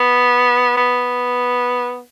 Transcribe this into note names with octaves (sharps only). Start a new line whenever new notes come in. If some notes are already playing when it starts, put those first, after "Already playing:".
Already playing: B3
B3